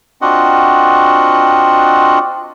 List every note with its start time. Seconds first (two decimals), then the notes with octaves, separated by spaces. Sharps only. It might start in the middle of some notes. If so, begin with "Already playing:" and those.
0.22 C4 D4 F4 F#4 D#5 F#5